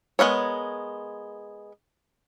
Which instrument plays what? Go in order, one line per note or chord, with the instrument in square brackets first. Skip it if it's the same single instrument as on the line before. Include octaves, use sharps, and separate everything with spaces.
[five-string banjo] G#3 B3 A#4 C#5